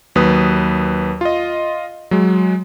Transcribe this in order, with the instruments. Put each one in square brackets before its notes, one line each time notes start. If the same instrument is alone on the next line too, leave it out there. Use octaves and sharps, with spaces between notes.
[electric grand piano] D#2 F#3 B4 D#6
F4 D#5
F#3 G#3